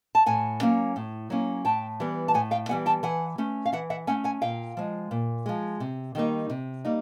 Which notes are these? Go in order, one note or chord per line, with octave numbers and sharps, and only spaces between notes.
A5
A2 F#5 G#5
F#3 A#3 C#4
A2
F#3 A#3 C#4
A2 G5 A5
E3 G3 B3
A5
A2 F#5 G#5
F5 G5
E3 G3 B3 F#5 G#5
G5 A5
E3 F#5 G#5
A3 C#4
F5
E3 E5 F#5
E5 F#5
A3 C#4 F#5 G#5
F#5 G#5
A#2 F5 G5
F3 G#3
A#2
F3 G#3
C3
D#3 G3 A#3 D#4
C3
G3 A#3 D#4